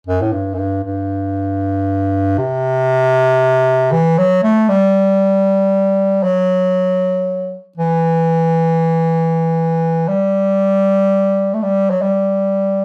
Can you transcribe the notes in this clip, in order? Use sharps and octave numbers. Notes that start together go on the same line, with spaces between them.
F#2
A2
G2
F#2
G2
G2
C3
E3
F#3
A3
G3
F#3
E3
G3
A3
G3
F#3
G3